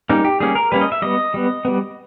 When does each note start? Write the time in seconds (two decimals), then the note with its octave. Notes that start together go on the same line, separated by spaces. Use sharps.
0.09 G3 A#3 C#4 D#4
0.25 G4
0.40 G3 A#3 C#4 G#4
0.55 A#4
0.72 G3 A#3 C#4 B4
0.81 D#5
0.92 E5
1.02 G3 B3 D#5
1.34 G3 B3
1.65 G3 B3